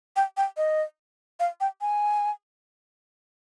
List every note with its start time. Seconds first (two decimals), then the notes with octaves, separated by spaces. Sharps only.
0.16 G5
0.37 G5
0.57 D#5
1.40 F5
1.61 G5
1.81 G#5